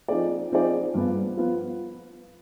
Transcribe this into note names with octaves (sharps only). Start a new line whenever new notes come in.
F3 C4 D#4 G#4 D5
F3 C4 D#4 G#4 D5
G2 F3 B3 F4
F3 B3 F4